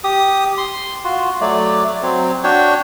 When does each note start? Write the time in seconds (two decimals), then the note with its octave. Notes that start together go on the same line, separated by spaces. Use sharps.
0.04 G4 D#6
0.58 C6
1.04 F4 F#4
1.41 F#3 A3 D5
2.03 F#3 C4
2.44 D4 F#4 C#5 G5